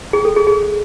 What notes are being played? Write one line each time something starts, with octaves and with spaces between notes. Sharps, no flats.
G#4
A4
G#4
G#4